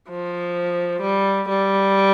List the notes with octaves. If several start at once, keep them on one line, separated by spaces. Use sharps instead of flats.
F3
G3
G3